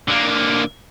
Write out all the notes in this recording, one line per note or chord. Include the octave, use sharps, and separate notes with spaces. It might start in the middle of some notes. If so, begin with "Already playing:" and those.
D3 A#3